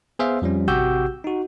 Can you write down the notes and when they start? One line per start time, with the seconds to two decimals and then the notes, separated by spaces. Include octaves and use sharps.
0.19 B3 G#4 C5 E5 F5
0.42 F2 F3 G3 C#4
0.68 A1 C3 F#4 G4 E6 G6
1.24 D#4 F#4